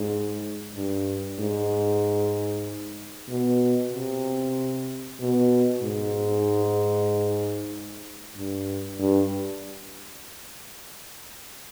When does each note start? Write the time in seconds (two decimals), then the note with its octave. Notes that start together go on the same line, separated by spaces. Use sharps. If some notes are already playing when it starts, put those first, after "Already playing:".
Already playing: G#2
0.76 G2
1.39 G#2
3.29 B2
3.93 C3
5.20 B2
5.83 G#2
8.37 G2
9.00 G2